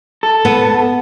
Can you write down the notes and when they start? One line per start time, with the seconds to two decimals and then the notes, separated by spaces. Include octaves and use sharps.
0.23 A4
0.45 B3